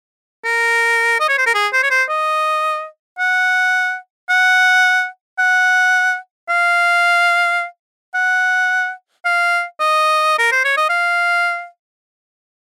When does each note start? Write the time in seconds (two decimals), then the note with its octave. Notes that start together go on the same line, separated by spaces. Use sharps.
0.45 A#4
1.20 D#5
1.28 C#5
1.38 C5
1.46 A#4
1.54 G#4
1.73 C5
1.83 C#5
1.91 C5
2.09 D#5
3.19 F#5
4.29 F#5
5.39 F#5
6.49 F5
8.14 F#5
9.25 F5
9.80 D#5
10.39 A#4
10.52 C5
10.65 C#5
10.77 D#5
10.89 F5